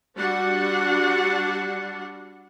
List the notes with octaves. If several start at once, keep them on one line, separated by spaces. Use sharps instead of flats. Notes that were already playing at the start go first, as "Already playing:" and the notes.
G3 D4 F#4 F#5